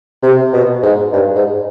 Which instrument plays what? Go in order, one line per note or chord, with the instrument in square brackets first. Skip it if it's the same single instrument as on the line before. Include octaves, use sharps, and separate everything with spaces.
[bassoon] C3
B2
G#2
G2
G#2